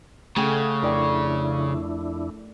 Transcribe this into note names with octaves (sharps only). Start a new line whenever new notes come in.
C#3 A3 G#4 F#5 G5
F2 D4 E4 A#4 D5 G5